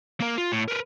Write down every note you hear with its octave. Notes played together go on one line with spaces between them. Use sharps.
A#3 A#4
F4
A2
A#4 B4